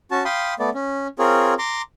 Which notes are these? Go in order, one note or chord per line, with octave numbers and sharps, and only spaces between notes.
C#4 F#4 A5
F5 G5 B5 C6 D#6
A3 B3 D5
C#4
C4 F4 G#4 A#4 C#5
A#5 C6 D6